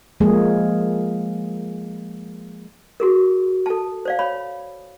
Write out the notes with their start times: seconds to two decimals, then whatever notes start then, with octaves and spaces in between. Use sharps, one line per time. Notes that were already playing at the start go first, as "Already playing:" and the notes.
0.20 F3 G#3 A#3 G#4
3.00 F#4 G#4 A#4
3.66 A4 A5
4.05 C5 D5 F5
4.19 C#5 B5